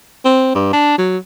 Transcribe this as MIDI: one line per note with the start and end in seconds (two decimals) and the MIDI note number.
0.25 0.50 60
0.55 0.72 43
0.73 0.94 62
0.98 1.18 54